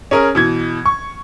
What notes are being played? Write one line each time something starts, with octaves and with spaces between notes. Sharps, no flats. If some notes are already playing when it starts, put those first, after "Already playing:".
C#4 G#4 A#4
B2 E3 G#6
C#6